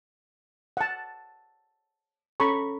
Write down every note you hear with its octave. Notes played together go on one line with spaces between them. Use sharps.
F#5 A5
C#4 A4 A#5 B5 C#6